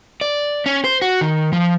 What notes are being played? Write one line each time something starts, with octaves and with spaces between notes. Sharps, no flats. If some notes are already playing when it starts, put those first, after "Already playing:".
D5
C#4
C5
F#4
D#3
F3